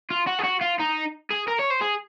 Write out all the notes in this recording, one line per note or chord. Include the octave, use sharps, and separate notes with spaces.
F4
F#4
G#4
F#4
F4
D#4
G#4
A#4
C#5
C5
G#4